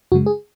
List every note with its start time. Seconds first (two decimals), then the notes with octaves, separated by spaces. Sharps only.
0.12 F#2 C#3 G#3 F#4
0.26 G#4